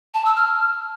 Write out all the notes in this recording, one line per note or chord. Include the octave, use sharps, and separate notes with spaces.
A5
E6
F6